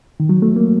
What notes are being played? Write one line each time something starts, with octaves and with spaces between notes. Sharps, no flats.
D#3
F#3
A3
A#3